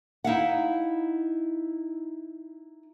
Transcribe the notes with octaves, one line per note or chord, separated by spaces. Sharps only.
D#4 E4 F5 F#5